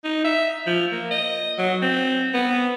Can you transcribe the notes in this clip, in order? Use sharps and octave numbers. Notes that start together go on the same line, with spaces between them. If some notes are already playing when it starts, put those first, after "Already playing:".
D#4
E5
F3
A#3
D#5
F#3
C4
B3